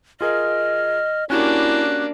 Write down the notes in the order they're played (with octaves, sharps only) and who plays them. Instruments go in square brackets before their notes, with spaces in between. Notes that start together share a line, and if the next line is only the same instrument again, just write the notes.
[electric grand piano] F4 G#4 A#4 [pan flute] D#5 [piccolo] F6
[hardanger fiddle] A#3 D4 [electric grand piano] C#4 F#4 G4 [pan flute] E4 [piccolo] F#6